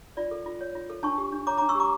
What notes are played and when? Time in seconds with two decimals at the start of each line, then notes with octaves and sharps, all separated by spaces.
0.17 F4 D5
0.31 A4
0.46 F4
0.61 C#5
0.75 F4
0.90 A4
1.03 D4 A5 C#6
1.18 G4
1.32 D4
1.47 C#5 A#5 D6
1.58 D4 A#5 D6
1.69 C#6 E6
1.75 G4 A#5 D6